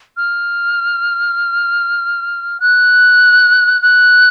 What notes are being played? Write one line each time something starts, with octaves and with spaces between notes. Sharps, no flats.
F6
F#6
F#6